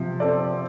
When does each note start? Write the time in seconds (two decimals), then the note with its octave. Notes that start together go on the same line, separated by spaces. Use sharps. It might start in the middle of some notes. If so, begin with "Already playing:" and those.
Already playing: C3 F3
0.20 C4 A4 D5